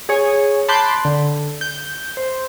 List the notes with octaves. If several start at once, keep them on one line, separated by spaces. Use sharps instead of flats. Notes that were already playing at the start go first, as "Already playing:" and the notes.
G#4 C#5
A5 B5 C6 D6 F#6 G6
D3
G6
C5